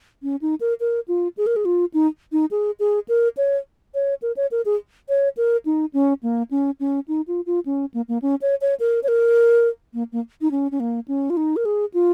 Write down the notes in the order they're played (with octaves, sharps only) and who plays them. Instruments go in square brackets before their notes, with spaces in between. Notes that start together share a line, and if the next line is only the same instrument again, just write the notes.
[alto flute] C#4
D#4
A#4
A#4
F4
G#4
A#4
G#4
F4
D#4
D#4
G#4
G#4
A#4
C#5
C#5
A#4
C#5
A#4
G#4
C#5
A#4
D#4
C#4
A#3
C#4
C#4
D#4
F4
F4
C#4
A#3
A#3
C#4
C#5
C#5
A#4
C#5
A#4
A#3
A#3
D#4
C#4
C#4
A#3
C#4
F4
D#4
A#4
G#4
F4